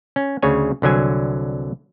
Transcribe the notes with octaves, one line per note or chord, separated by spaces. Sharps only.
C#4
D2 C#3 C#5 G#5
C2 D3 F#3 G#5